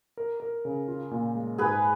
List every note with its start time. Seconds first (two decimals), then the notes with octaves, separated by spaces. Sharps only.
0.17 A#4
0.40 A#4
0.65 C#3
0.88 F4
1.11 A#2
1.35 G#3
1.58 G#2 G#4 B4